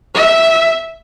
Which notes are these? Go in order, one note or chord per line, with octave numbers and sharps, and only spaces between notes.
E5